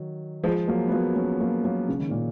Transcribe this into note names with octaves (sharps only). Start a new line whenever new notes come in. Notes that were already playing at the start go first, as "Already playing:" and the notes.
Already playing: D#3 F#3
F3 G#3
F#3 A#3
B3
F#3 A#3
A#3 C#4
F#3 A#3
F#3 A#3
C#3
D#3
A#2 C#3